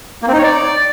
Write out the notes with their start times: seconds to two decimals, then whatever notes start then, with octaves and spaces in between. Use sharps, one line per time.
0.22 A#3
0.28 C4
0.33 D#4
0.38 C#5
0.43 D5